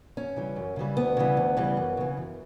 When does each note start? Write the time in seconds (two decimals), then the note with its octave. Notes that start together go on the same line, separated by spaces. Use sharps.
0.17 F#2 C#4
0.36 C#3 E3 G3
0.56 F#2
0.76 C#3 E3 G3
0.97 D2 B3
1.17 C#3 E3 G3
1.37 D2
1.57 C#3 E3 G3
1.77 F#2
1.97 C#3 E3
2.17 F#2